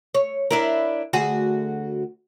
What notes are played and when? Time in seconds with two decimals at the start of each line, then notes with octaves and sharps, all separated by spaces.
0.14 C#5
0.51 D4 E4 A#4
1.13 D2 F#4 G#4